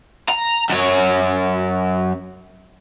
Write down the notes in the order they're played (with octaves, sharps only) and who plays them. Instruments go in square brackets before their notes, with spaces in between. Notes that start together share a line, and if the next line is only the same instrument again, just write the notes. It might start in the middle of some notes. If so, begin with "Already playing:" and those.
[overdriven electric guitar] A#5
F#2 C#5